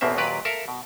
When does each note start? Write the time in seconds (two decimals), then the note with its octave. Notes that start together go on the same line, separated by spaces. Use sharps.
0.01 A1 E2 B2 A#3 C4 E5
0.17 D#2 A#2 F#3 G4 B4 D5
0.45 A4 A#4 E5 F5
0.68 B2